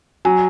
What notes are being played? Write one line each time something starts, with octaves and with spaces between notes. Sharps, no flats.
F#3 G#5